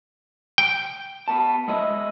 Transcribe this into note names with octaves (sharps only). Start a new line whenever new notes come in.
G5
B3 A5
G#3 E4 D#5